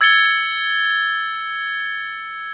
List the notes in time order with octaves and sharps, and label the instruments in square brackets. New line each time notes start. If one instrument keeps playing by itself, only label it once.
[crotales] E6 G#6 A6 C#7 G7